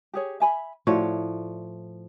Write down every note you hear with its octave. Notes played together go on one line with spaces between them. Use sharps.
G4 G#4 C#5
E5 G#5 B5
A2 F3 E4 F#4 C#5 D5